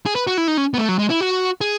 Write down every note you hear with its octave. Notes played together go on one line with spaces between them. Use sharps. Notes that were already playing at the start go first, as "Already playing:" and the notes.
G#4
B4
F#4
E4
D#4
C#4
B3
A3
F#3
G#3
E4
F#4
G#4